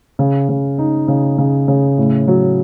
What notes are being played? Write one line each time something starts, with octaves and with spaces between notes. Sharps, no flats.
C#3
C#3
D#4
C#3
C#3
C#3
A2
F#3